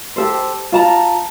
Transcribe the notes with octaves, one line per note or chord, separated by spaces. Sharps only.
G4 A4 C5
F4 A5 A#5